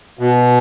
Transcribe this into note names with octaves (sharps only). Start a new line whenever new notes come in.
B2